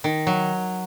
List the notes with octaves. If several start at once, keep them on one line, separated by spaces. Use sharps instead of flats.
D#3
F#3